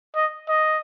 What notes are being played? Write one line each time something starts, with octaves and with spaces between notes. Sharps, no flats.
D#5
D#5